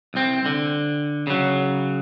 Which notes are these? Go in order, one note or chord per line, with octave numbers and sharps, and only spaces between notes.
C2 C4
D3
C#3 F#3